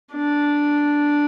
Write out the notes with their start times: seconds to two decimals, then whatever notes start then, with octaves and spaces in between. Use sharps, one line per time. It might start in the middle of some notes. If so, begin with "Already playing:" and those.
0.13 D4